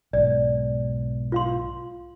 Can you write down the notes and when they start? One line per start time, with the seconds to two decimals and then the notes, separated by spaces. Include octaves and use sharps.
0.13 B1 G#2 D5
1.32 F4 F5 C6